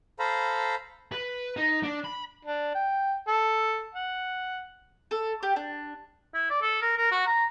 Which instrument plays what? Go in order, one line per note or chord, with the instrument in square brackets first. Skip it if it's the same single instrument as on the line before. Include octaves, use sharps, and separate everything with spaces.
[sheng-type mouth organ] A4 C5 F5 A#5 B5
[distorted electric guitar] B4
D#4
D4
B5
[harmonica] D4
G5
A4
F#5
[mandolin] A4
G4
D4
[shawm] E4
D5
A4
A#4
A#4
F#4
A#5